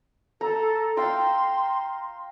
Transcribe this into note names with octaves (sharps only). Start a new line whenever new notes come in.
A4 A#5
F5 G5 A#5 C6